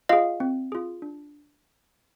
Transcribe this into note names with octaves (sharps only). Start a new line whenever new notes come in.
F4 G#4 D#5 F5
C4
F4 G#4
D4